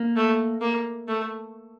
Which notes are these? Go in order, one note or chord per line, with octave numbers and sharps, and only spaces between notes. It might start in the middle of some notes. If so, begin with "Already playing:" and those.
Already playing: A#3
A3
A#3
A3